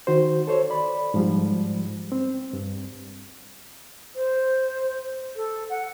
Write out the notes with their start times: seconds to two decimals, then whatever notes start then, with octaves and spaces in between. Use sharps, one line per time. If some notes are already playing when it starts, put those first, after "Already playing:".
0.07 D#3 F#4 C5
0.47 A4 C5 C#5
0.70 D5 B5
1.14 G#2 F3 G3
2.12 C4
2.53 G2
4.15 C5
5.35 A4
5.69 F#5